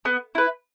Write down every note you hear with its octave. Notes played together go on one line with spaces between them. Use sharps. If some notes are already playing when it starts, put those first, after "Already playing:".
B3
E4 B4